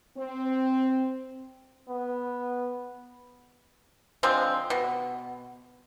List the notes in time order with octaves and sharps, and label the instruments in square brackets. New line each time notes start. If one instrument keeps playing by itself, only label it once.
[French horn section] C4
[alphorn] B3
[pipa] D3 F3 G#3 C4
B2